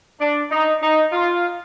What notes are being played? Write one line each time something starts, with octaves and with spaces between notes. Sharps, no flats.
D4
D#4
D#4
F4